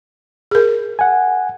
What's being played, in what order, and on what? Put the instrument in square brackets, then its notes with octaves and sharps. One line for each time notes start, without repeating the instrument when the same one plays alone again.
[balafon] G#4 A#4
[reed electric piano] F#5 G#5